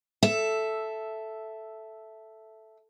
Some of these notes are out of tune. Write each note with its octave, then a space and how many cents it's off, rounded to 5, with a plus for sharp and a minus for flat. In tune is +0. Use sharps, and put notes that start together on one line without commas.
A4 -5 E5 +0